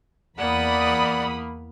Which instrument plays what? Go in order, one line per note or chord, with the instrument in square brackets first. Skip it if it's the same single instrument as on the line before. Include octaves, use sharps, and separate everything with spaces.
[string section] E2 B5 D#6 [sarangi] A#3 [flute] D5 [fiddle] F#5